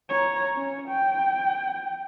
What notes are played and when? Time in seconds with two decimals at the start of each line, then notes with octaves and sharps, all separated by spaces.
0.10 C#5 A#5
0.54 C#4 C#5
0.89 G5